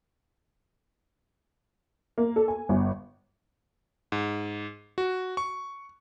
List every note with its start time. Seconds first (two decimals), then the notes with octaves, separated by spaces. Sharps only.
2.18 A#3
2.36 A4
2.48 G#5
2.69 G1
4.12 G#2
4.98 F#4
5.37 C#6